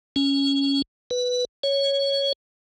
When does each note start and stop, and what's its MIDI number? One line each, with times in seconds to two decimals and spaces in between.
0.16 0.82 61
1.11 1.45 71
1.63 2.33 73